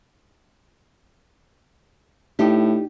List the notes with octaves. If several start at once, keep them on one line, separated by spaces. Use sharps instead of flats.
A2 D4 D#4 G4